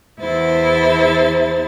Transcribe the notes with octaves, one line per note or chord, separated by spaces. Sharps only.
E2 E4 C5 A6